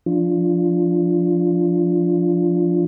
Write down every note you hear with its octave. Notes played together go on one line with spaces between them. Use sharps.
F3 D4 F4